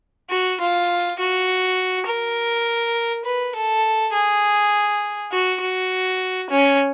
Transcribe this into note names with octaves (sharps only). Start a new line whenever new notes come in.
F#4
F4
F#4
A#4
B4
A4
G#4
F#4
F#4
C#4